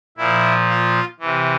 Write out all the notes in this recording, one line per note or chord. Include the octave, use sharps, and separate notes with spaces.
A#2 F3 E4
F4
C3 E3